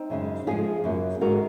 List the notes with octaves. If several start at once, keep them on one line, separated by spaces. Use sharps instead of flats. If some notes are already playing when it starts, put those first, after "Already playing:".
Already playing: C4 D#4
F#2 C#3 G#3
G#2 F3 G#3 F4 G#4
F#2 C#3 F#3 A#3
G#2 D#3 G#3 F#4 A#4